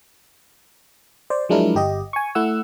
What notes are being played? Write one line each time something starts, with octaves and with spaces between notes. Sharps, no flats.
C5 D5
F3 F#3 G#3 D4 E4 A#4
G1 G4 D#5
G#5 C#6
A3 E4 F#5 E6